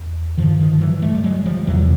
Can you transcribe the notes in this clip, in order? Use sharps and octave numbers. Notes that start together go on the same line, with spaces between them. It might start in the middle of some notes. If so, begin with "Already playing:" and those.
Already playing: E2
G2 D3 D#3 F3
D#3 F3
E3 F#3
G3 A3
G3
F#3 G#3
F3 G3
E2 C3 E3 F#3